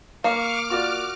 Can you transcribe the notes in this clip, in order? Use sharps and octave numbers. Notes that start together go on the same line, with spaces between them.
A#3 F5 C#6 D6 F6
F4 F#4 A#4 D5